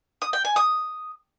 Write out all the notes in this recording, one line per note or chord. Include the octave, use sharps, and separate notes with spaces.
D#6
G5
G#5
D#6